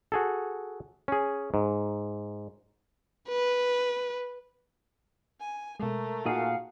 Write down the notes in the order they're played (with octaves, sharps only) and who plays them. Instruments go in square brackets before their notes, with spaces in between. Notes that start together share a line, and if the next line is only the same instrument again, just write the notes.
[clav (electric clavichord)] F#4 G#4 A4
C#4 G#4
G#2
[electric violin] B4
[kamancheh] G#5
[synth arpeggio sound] B2 G#3 [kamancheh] A3 A#4
[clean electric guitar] A#2 G#4 [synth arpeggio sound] D#4 F#4 [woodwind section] F5 F#5